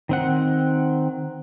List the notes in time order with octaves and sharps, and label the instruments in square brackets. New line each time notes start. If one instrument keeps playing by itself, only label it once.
[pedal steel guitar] D#3 C4 F#5